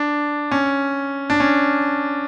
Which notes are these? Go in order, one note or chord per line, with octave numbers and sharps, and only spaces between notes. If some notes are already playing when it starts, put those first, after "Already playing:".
Already playing: D4
C#4
D4
C#4